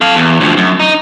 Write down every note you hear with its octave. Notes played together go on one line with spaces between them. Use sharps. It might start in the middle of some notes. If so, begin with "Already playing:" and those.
A4 F5
E2
D2 F3
F#2
D#4